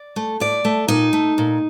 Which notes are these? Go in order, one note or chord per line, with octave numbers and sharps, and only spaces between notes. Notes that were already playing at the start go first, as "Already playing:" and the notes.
Already playing: D5
A3
A2 D5
A3
A#2 D#4
A3
A#2